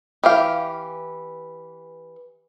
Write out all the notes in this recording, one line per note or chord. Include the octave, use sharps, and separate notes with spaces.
E3 G4 F5